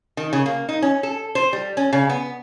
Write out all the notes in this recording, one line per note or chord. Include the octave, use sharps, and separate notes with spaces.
D#3
C#3
A#3
D#4
C#4
A4
C5
G3
C#4
C#3
B3